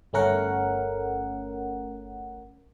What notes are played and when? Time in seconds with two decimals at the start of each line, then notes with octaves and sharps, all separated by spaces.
0.13 G1 A3 C#4 A#4 F#5